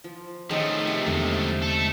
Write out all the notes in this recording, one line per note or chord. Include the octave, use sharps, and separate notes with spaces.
F3
D#3 F3 A3 C#4 G#4 D#5
C3
E2 D3 G#3 C5 D#5
A3 A4